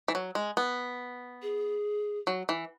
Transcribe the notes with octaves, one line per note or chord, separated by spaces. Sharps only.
E3
F#3
G#3
B3
G#4
F#3
E3